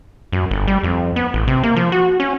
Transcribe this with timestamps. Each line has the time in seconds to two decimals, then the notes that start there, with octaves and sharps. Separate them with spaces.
0.32 F#2
0.51 G1
0.68 G3
0.83 F2
1.16 B3
1.34 A1
1.48 C3
1.63 A#3
1.76 F3
1.92 F#4
2.20 C#4